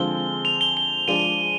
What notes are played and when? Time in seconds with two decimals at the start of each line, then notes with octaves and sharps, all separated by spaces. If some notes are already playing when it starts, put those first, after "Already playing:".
Already playing: D3 F3 G#3 C4 G7
0.45 F7
0.61 G7
0.77 G7
1.08 F3 G#3 D4 D#7